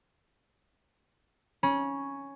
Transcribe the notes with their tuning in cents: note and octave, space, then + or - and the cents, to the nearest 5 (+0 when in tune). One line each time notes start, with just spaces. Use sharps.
C#4 +0 B5 -40